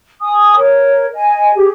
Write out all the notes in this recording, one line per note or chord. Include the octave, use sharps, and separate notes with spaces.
G#5 D#6
A#4 C#5
D#5 G#5
G4 G#4